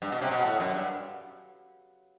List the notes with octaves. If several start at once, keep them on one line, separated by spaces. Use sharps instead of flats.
G2
B2
C3
B2
A2
F#2
G2